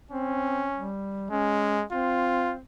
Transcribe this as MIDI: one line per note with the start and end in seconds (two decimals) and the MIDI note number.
0.11 0.66 60
0.11 0.90 61
0.75 1.27 55
1.31 1.84 56
1.31 1.82 61
1.92 2.60 60
1.92 2.54 65